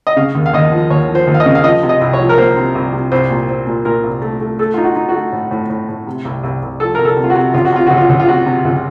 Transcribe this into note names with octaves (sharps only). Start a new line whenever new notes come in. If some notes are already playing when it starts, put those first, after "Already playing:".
D#5
C#3 F5
D#2
F5
D#2 D#5
F3
D#2 C#5
F3
C5
D#2
F5
D#5
C#3
F5
F3 D#5
C3
D#5
C2
C#5
F3
A#4
A#3 C5
C3
C2
C3
C2 C5
A#2
C4
A#2
A#2 A#4
C2
A3
A3
A3 A4
D#4 F4
F#4
D#4
F#4
A3
A2
A2
A2
A2
C3
C2
C2
C2
F3 A4
C2 A#4
A4
C3
F4
F#4
C3
C#2 F4
F#4
C3 F4
C#2 F#4
F4
C#2
F4
C3 F#4
C3
C#2